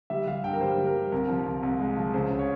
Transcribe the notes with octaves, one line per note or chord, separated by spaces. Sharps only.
G3 E5
G3 F5
G2 G5
A#4
G3 C5
G3
A#4
G3
C2 A#4
F3
C2
C2
G#3
F3
C#2 C5
C#3
C#5